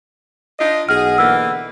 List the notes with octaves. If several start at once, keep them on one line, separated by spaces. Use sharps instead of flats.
D4 F4 D#5
B1 G#4 D#5 F#5 F6
D3 E3 A#3 E6